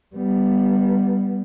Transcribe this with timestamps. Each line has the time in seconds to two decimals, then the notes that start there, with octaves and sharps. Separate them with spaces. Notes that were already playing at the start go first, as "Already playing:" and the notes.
0.16 G3 B3